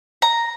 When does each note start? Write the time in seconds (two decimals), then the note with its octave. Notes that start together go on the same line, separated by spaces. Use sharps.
0.22 A#5